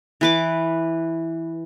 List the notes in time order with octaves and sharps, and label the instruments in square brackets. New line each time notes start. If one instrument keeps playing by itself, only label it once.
[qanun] E3 B4 D6